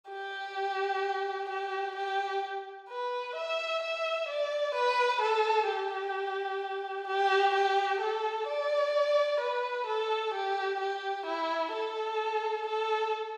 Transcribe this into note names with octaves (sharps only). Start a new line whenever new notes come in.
G4
G4
G4
B4
E5
E5
D5
B4
A4
G4
G4
G4
A4
D5
B4
A4
G4
G4
E4
A4
A4